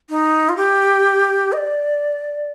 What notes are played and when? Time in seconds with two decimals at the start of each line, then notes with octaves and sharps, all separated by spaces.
0.10 D#4
0.49 F4
0.57 G4
1.52 D#5
1.57 D5